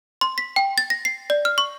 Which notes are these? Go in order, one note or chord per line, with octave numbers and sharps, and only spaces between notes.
C6
B6
G5
A6
A#6
C7
D5
F6
C#6